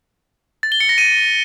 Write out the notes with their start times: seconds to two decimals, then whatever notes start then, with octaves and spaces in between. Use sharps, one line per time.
0.63 A6
0.72 G7
0.80 C#7
0.89 A#6
0.98 D#7